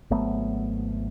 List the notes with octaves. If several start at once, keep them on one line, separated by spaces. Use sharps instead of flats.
G#1 F#3 A3 B3